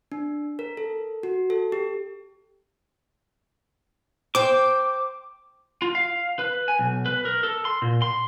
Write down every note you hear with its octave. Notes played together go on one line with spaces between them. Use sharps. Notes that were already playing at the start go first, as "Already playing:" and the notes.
D4
A#4
A4
F#4
A4
G4
C5 G5 D6
F4
F5
B4
G#5
B1
B4
A#4
A4
C6
A#2
C6